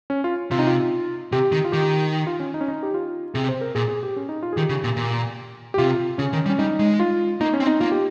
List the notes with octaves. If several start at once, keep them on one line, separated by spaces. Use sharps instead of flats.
C#4
F4
C3 F4
D#4
F4
C3 G4
D#3
F4
D#3 G4
F4
C#4
D#4
C#4
D#4
G4
F4
C3 G#4
C5
A#4
A#2 G#4
G#4
G4
C#4
D#4
F4
G#4
D#3 G4
C#3
A#2
A#2
G4
C3 F4
C#3 C#4
D#3
G3
C#4
G3 D#4
G#3
F4
A#3 D#4
C#4
C4
D#4
A#3 F4
G4